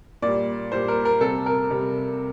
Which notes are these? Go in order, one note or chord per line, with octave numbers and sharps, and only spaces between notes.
A#2 G3 D5
A#2 G3 C5
A#4
A#4
C3 G3 A4
A#4
C3 G3